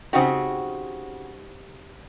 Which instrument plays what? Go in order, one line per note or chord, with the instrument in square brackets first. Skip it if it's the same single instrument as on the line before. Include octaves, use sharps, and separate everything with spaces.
[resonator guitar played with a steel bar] C#3 F#4 [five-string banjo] C4 D#4 G4